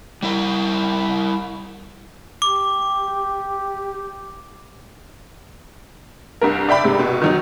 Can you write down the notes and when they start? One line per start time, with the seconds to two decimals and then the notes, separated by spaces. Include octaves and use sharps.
0.23 G3 E4 A#4
2.42 G4 D6
6.41 C2 G2 A#4
6.69 D5 E5 G5 B5
6.84 G#2 C3
6.99 B2
7.22 D#3 F#3 D#4